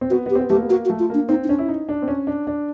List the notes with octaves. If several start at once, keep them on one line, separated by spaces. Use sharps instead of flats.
C4
B3 F#4
B3 G4
C4
B3
A3 G4
A#3
B3
A#3 F#4
F#4
A3
F4
A#3 D4
C4 D#4
D#4
C#4 D4
E4
D#4
D4
C4
C#4
D4
D4